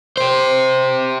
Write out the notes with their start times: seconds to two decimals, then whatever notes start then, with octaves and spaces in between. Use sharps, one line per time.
0.17 G4 C5